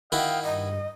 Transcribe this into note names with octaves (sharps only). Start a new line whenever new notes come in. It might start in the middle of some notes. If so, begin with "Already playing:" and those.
D#3 E4 F#4 D#5 F5 G5
G2 D#5